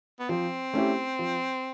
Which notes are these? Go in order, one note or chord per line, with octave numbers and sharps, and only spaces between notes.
B3
F3 C4
A3 C#4 E4 G4
F3